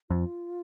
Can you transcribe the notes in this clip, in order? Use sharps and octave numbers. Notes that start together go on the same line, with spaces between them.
F2 F4